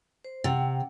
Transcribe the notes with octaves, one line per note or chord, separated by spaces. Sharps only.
C5
C3 F#5 G5